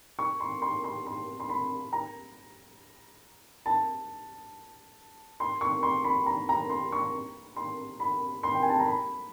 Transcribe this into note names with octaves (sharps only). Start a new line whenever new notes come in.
C#6
C6
C6
C6
C6
C6
B5
A#5
A5
C6
C#6
C6
B5
A#5
A#5
C6
C#6
C6
B5
C6
G5
G#5
A5
A#5
B5